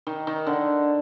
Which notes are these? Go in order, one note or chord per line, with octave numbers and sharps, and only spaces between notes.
D#3
D#3
D3